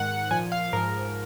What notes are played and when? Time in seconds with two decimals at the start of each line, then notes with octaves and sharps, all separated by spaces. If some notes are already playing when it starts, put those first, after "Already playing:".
Already playing: G#2 D#3 F#5
0.31 A#2 F3 G#5
0.52 F5
0.73 G#2 F3 A#4